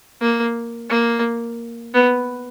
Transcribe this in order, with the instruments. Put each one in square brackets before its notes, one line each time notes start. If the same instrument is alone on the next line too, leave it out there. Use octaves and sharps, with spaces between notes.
[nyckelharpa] A#3
A#3
B3